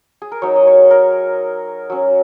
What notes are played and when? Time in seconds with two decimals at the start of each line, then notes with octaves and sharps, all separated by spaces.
0.22 G#4
0.32 A#4
0.42 F#3 D#4 C#5
0.56 D#5
0.67 C#5
0.91 A#4
1.90 F#3 C#4